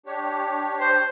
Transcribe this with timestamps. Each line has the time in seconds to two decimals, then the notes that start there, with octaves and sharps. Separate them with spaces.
0.06 D4 G4 C#5
0.79 C5